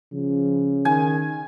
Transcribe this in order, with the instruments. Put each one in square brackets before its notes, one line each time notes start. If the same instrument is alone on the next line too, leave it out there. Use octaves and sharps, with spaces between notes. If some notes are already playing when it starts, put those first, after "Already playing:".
[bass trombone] C#3 [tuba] F3
[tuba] D#3 [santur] G#5